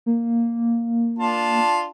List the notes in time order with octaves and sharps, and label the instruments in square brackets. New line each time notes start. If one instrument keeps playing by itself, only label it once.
[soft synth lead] A#3
[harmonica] D4 F4 A5